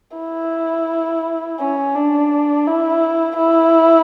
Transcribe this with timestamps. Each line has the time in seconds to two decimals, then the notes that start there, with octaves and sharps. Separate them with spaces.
0.18 E4
1.60 C#4
1.95 D4
2.67 E4
3.38 E4